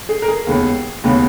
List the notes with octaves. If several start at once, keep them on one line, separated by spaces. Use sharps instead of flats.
G#4
A#4
G#4
D#2 C#3 G#3 B3
D#2 C#3 G#3 B3